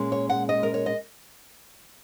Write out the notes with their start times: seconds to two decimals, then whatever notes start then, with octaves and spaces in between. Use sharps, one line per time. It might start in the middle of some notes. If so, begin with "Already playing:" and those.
Already playing: A#2 G#3 C#4
0.12 C#5
0.30 F#5
0.49 D#5
0.63 A#4
0.74 C#5
0.86 D#5